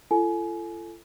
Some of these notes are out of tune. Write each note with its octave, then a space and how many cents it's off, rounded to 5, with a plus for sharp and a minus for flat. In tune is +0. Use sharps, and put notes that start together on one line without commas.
F4 -45 A4 +0 G#5 +25